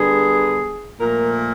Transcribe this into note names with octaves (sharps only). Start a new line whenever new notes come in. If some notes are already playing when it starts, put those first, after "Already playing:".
Already playing: D3 G3 B3 G#4
A#2 F3 A3 A#4